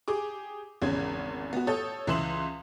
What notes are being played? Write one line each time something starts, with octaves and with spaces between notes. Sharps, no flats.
G4 G#4 D6
G#1 E2 C#3 G#3 C#4 G#6
B3 F#4
A4 C#5 D#6 G6 A6
C#2 E3 E5 C6 E7 F#7